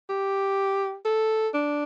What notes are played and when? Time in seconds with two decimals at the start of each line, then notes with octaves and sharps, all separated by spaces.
0.10 G4
1.05 A4
1.54 D4